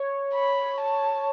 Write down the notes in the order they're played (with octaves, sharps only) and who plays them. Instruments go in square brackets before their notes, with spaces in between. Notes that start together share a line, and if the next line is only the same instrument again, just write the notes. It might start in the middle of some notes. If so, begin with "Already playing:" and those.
Already playing: [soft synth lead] C#5
[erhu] B5
A5